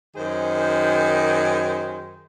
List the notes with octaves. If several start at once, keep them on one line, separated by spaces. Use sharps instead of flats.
F#2 D#3 G#4 C5